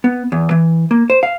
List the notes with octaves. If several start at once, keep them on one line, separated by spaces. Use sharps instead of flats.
B3
E2
E3
A#3
C5
F5